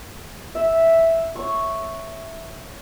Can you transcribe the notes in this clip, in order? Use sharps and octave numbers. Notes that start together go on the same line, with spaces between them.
E5
C#5 C#6